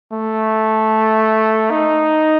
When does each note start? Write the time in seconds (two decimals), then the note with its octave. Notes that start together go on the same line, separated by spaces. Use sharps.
0.13 A3
1.71 D#4